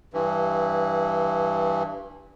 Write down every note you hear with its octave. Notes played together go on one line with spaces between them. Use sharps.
G2 E3